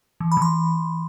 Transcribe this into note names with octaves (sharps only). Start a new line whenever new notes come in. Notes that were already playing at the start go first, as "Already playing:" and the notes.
E3
B5
E3 C6